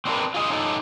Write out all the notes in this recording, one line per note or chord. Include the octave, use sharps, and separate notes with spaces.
C4 D4 D#4 F4 A#4 B4
F4 G#4 D#5
C#4 D#4 G4 A4 D#5